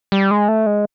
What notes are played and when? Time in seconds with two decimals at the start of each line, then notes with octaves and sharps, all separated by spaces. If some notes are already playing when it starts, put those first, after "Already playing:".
0.12 G3
0.31 G#3
0.48 A3
0.66 G#3